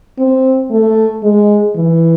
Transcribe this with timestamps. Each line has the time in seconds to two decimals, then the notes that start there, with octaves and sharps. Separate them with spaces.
0.18 C4
0.71 A3
1.23 G#3
1.76 E3